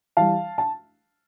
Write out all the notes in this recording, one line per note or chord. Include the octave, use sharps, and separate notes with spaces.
E3 G3 F5 A5
A5